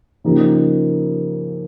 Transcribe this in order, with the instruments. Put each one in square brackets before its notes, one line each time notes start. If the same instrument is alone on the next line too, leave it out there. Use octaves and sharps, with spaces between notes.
[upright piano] C#3 F3 A#3 D#4 G4